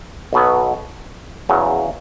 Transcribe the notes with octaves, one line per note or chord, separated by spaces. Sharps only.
B1 B2 F#3 B3
E2 C#3 F#3